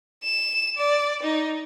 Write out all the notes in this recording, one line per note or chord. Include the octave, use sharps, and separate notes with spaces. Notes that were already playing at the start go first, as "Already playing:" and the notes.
E7
D5
D#4